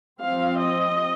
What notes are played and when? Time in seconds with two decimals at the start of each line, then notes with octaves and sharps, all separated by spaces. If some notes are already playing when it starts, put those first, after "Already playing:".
0.22 F3 C4 F5
0.59 D#5